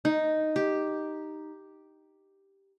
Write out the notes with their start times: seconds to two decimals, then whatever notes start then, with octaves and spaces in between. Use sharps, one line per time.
0.05 D#4
0.56 G4